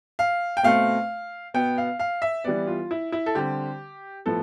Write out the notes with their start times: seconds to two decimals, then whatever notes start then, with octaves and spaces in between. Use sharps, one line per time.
0.19 F5
0.57 G5
0.63 B2 A3 C4 F5
1.54 B2 B3 G5
1.78 F5
1.99 F5
2.22 E5
2.44 E3 G3 B3 D5
2.67 F4
2.91 E4
3.12 E4
3.26 A4
3.35 D3 G3 C4 G4
4.26 A2 F3 B3 A4